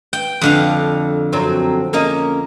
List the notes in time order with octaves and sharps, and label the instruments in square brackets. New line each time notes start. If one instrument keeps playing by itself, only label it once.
[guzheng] G5
F2 D3 F5
[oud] F#2 F#3 C4
A#3 C#4 D#5